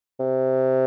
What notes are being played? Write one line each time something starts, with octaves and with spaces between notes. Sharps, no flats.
C3